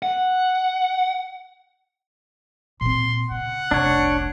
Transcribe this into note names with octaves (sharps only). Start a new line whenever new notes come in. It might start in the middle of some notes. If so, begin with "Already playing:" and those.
F#5
A#2 C4 C6
C#3 F#5
F1 C2 D4 C#5